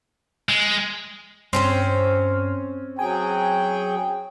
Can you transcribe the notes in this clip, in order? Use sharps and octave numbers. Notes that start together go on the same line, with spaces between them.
G#3
G2 C4 C#4 C5 C6 F6
F#3 G#4 G5 G#5